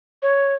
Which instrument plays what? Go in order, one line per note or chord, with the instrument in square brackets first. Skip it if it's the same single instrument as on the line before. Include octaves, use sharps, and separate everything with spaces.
[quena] C#5